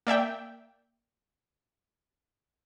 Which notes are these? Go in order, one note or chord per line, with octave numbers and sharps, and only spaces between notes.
A#3 D5 E5 G5